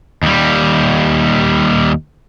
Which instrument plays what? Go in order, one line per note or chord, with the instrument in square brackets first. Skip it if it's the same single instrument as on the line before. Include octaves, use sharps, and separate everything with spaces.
[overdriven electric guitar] D#2 G3